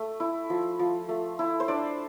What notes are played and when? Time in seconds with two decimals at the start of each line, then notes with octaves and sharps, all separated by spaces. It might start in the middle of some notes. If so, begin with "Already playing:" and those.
Already playing: A3
0.20 E4
0.50 F3
0.79 F3
1.09 A3
1.39 E4
1.60 C5
1.68 D4 D5